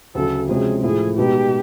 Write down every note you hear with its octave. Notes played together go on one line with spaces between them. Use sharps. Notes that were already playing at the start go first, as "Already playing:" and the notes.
D2 C#3 F#3 A4
C3 F3 G#3 C#4 F#4 G#4
A2 F3 A3 G#4
B2 G#3 B3 D#4 G4